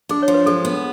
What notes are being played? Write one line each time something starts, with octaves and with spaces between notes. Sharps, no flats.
D4 G#4
C#5
F3
B4
G#3 A4
B3